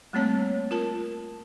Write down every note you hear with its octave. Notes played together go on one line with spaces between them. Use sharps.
G3 A3 A#3 C4 C#5 A5
F4 A#4 A5